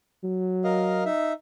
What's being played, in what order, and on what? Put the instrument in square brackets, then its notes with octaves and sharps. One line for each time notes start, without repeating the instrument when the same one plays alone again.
[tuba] F#3
[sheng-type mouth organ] A#4 D#5 F5
D#4 E5